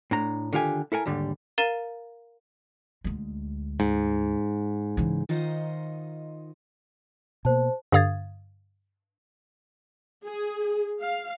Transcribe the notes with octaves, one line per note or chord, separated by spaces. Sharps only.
A2 D4 A#5
D3 D#3 F4 G4 G#5
E4 A4 A#4 G#5
D#2 G#2 D3 G3
A#4 F5 A#5 A6 D#7 E7
D2 G#3
G#2
C#3 E3
D#3 D#4 F4 C5 D#5 F#5
B2 A#3 C5 A5
G2 D3 F5 D#6 G#6 A6
G#4
F5